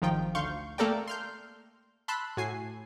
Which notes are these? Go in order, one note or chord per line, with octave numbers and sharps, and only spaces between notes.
G#1 D#3 F3 D#4 F4 G5
D2 F5 C6 C#6 G6
A3 A#3 A4 A#4 D5 G5
C6 F6 G6
A5 B5 C6 E6 F#6
A2 F#4 G#5 C7